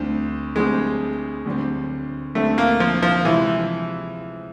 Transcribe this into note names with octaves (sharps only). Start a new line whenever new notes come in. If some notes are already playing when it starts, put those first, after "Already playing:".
Already playing: D2 D3 G3 C4
D2 D3 G3 G#3 C4
D2 D3 G3 C4
D2 D3 G3 A3 C4
A#3
F3
F3
C3 E3 F3 G#3